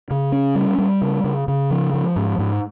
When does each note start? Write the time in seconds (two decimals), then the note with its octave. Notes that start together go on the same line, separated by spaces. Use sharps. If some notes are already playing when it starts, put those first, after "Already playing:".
0.11 C#3
0.32 C#4
0.55 G3
0.78 G3
1.02 C#3
1.24 C#3
1.48 C#3
1.70 F3
1.93 F3
2.16 G#2
2.38 G#2